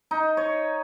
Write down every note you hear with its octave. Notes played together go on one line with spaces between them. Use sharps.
D#4
C#5